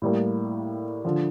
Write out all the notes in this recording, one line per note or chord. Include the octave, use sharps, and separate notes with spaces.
A2 G3 A#3
D3 F3